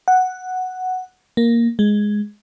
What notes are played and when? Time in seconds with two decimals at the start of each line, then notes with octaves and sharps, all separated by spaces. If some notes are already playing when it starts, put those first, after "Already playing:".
0.08 F#5
1.37 A#3
1.79 G#3